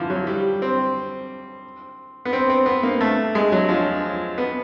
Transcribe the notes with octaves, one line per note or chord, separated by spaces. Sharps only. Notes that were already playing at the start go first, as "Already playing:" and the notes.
Already playing: D3 E3 F3
F#3
G3
C4
B3
C4
C4
B3
A#3
A3
G#3
F#3
F3
B3